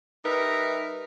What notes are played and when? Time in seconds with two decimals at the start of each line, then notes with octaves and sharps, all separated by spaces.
0.24 G3 D#4 A#4 B4 E5